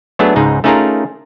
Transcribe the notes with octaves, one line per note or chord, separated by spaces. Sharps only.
F#3 A3 B3 D4 G#4
C#2 G#2 D#4 G#4
A3 C#4 D#4 F4 G#4 A#4